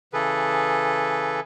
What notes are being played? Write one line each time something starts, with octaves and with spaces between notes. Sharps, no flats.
C#3 E3 G#4 A4 B4